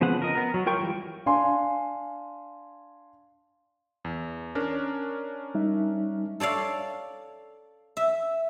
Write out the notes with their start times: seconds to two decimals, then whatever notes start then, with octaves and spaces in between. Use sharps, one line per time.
0.01 C#3 F3 B3 C4 F#5
0.22 A#4 D#5
0.35 B3 A#4
0.54 F#3
0.66 F4 A#4 G5 C#6
0.81 E3 G3
1.26 D4 F5 G#5 C6
4.05 E2
4.55 C#4 D4 A#4
5.55 G3 D#4 E5
6.40 A4 C#5 D5 F5
7.97 E5